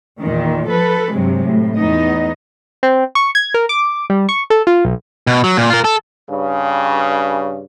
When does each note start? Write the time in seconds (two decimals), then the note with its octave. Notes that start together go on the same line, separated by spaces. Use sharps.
0.22 E2 A#2 D#3
0.68 F3 A4 B4
1.13 G2 C3 F#3 G#3
1.46 A2
1.76 E2 B3 D#4 D#5
2.83 C4
3.15 C#6
3.35 G#6
3.54 A#4
3.69 D6
4.10 G3
4.29 C#6
4.50 A4
4.67 F4
4.85 B1
5.27 B2
5.44 F#3
5.57 A#2
5.70 F4 A#4
5.84 A4
6.30 G2 C#3